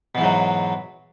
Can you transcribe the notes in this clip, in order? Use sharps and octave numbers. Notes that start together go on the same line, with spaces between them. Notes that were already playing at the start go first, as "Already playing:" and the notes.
G#2 B2 E3 F#3